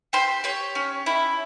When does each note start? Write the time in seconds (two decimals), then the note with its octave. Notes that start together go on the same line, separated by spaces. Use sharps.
0.13 G4 C5
0.44 G4 C#5
0.75 C#4
1.06 E4